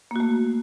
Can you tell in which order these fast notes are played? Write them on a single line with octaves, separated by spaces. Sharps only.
A#3 F#4 A3